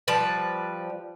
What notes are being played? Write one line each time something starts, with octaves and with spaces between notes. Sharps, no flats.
F3 G3 B4